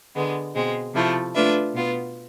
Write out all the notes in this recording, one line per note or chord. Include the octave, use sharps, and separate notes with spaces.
D3 G#3 B3
B2 G#3 C4
C3 F3 A3 E4
A3 D4 F4 B4 E5
B2 B3 F4